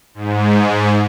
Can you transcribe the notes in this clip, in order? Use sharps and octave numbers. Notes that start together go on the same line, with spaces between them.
G#2